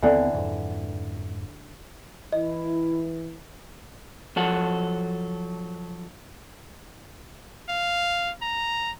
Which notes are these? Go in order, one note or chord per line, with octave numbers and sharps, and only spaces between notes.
D#2 D3 E3 B3 C4
F2 G#2
E3 E4 D#5
F3 F#3 A4 F#5
F5
A#5